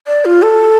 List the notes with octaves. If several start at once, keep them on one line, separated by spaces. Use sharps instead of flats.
D5
F4
A4